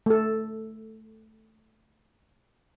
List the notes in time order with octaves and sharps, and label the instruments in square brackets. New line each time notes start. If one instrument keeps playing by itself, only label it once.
[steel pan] A3 A4